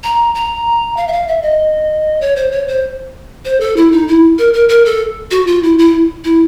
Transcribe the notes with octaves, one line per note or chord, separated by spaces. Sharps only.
A#5
A#5
F5
E5
F5
E5
D#5
C#5
C5
C#5
C5
C5
A4
E4
D#4
E4
A#4
A#4
A#4
A4
F#4
F4
E4
E4
E4